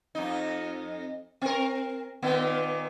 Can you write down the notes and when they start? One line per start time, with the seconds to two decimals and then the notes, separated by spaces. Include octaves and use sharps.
0.15 F2 D#4
1.42 C4 A#4
2.22 A#2 D#3 B3